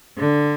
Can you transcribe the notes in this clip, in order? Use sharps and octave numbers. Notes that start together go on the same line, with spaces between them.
D3